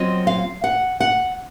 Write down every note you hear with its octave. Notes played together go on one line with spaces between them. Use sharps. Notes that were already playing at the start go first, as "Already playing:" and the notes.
Already playing: F#3 C4 F4 D#5
F5
F#5
F#5